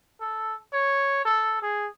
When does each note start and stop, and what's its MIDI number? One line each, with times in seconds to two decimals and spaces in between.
0.20 0.55 69
0.72 1.21 73
1.25 1.59 69
1.62 1.88 68